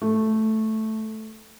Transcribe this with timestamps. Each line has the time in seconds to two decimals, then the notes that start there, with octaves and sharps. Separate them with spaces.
0.02 A3